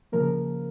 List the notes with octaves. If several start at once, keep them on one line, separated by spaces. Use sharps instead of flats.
C#3 F3 A#3 A#4